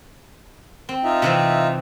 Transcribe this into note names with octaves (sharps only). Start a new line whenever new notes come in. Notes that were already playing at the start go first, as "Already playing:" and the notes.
C4
D#4 F4 E5
C3 E3 C4